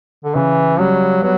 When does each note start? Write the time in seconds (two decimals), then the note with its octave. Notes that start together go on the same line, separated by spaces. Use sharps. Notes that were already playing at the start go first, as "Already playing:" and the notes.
0.24 D3
0.35 C#3 E3
0.79 F#3 G3
1.22 F#3 B3